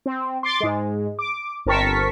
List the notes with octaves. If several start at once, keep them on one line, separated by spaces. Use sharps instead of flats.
C4
C6 D6 A6
G#2 G#3
D6
G1 C4 A#4 A5 C#6 B6